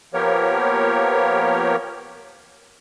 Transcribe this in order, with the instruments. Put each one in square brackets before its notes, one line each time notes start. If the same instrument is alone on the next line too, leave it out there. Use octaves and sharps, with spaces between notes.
[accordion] F3 A#3 B3 G4 A#4 C#5